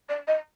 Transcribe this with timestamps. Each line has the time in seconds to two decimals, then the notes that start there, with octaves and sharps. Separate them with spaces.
0.09 D5
0.27 D#5